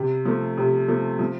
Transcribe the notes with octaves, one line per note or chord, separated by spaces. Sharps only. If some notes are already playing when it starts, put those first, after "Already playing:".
Already playing: C3
F3 A3
C3
F3 A3
F3